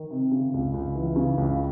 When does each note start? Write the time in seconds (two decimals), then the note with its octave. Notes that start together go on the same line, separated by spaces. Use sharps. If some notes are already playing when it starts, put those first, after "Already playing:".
Already playing: D#3
0.11 C3
0.32 C#3
0.54 C#2
0.74 C#2
0.96 E3
1.16 C#3
1.38 C#2